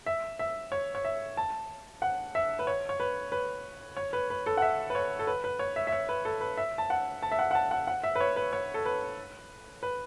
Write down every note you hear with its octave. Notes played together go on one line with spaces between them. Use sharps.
E5
E5
C#5
C#5
E5
A5
F#5
E5
B4
C#5
C#5
B4
B4
C#5
B4
B4
A4
F#5
E5
B4
C#5
A4
B4
B4
C#5
E5
E5
C#5
B4
A4
B4
E5
A5
F#5
A5
E5
F#5
F#5
A5
F#5
F#5
E5
B4
C#5
B4
C#5
A4
B4
B4